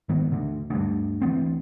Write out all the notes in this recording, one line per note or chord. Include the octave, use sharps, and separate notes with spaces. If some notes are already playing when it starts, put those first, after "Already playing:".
G#2 D#3 B3
D2 D3
D2 G2
D2 E3 B3 C4